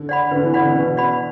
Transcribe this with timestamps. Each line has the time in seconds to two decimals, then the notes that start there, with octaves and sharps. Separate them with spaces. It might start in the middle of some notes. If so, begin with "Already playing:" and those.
Already playing: D3
0.09 D5 F#5 B5
0.31 D3 B4
0.43 E3
0.54 D3 D5 F#5 B5
0.65 C#3
0.76 B2 B4
0.97 D5 F#5 B5